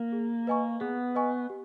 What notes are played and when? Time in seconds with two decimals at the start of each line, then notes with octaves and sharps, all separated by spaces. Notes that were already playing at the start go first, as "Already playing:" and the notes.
Already playing: A#3
0.12 G#4
0.47 B4 D#5 G#5 C#6
0.81 B3 G#4
1.15 B4 D#5 G#5 C#6
1.50 G4